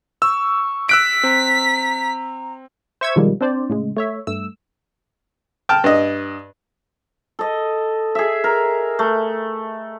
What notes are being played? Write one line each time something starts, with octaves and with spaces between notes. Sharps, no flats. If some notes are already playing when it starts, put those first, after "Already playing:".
C#6 E6
E6 F#6 B6 D7
C4 A#5
C5 E5 C#6 E6 G#6
B2 D#3 F3 G3 G#3 A#3
C4 D4 C5 D5
A2 C#3 G#3
A3 C#5 E5
G2 A3 E6
G5 A5 F6
G2 D#5
A4 D#5
G#4 E5
A#4
A3